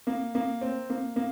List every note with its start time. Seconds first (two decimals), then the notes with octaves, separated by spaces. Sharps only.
0.07 A#3
0.35 A#3
0.61 C4
0.90 A#3
1.16 A#3